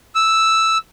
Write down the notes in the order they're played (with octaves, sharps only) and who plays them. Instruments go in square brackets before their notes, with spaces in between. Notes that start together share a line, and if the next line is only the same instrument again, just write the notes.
[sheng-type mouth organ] E6